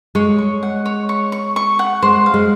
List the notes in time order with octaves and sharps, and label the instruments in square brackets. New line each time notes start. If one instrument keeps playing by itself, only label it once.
[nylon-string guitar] G#3 [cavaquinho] C#5
[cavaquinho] C#6
F#5
C#5
C#6
C#6
C#6
F#5
[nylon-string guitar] G#3 [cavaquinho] C5
[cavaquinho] F5
[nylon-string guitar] G#3